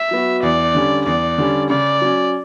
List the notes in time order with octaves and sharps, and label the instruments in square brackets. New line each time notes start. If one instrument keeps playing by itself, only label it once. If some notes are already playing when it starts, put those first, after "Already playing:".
Already playing: [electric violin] E5
[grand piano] F#3 B3 F#4
[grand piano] E2 [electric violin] D5
[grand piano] D3 G3 C#4
[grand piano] E2 [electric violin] D5
[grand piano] D3 G3 C#4
[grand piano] C#3 [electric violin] D5
[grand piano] F#3 C#4